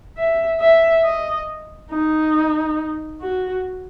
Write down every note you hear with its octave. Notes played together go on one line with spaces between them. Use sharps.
E5
E5
D#5
D#4
F#4